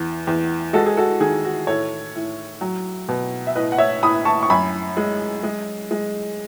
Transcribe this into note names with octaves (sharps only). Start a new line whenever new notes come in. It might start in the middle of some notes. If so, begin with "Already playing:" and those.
Already playing: E2
E2
G#3 F#4 A4
G#4
F#4 A4
D#3 G#4
F#4
A2 A4 C#5
A2
F#3
B2
E5
A2 B4 D#5
F#5
C#5 E5
A2 B5 D#6
A5 C#6
C#6
F#2 G#5 B5
G#3
G#3
G#3